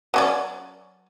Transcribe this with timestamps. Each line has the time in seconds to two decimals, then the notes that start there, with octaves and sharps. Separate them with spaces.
0.14 F#3 C#4 D5